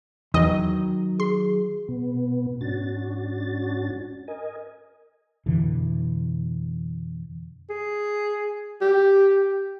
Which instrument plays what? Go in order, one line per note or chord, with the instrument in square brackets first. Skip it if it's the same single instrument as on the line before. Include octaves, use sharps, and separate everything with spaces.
[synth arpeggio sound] E2 D#5 [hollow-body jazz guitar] D#3 F#3
[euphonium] G#4 [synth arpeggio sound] C6
[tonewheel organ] B2 B3
G#2 C#4 D4 F#4 A6
A#4 D#5 G#5
[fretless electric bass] F2 B2 D3 E3
[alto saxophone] G#4
G4